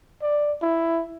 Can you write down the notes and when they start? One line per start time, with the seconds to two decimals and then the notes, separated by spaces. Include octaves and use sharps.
0.22 D5
0.62 E4